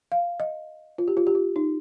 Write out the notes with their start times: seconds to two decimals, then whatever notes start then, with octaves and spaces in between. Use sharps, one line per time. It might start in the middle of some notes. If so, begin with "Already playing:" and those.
0.12 F5
0.40 D#5
0.98 F4
1.08 G4
1.17 F4
1.27 G4
1.35 F4
1.56 D#4